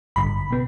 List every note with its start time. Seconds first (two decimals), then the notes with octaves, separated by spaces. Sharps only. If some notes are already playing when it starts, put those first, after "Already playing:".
0.16 A1 G2 D3 B5
0.51 B2 B3